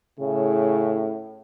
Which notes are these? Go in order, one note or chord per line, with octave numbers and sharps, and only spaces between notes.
A2 C#3